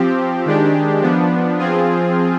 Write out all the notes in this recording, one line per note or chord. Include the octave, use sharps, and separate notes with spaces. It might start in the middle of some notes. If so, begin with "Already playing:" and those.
Already playing: F3 C4 G4
D#3 G#3 D4 G4
F3 B3 D4
F3 C4 F4 G#4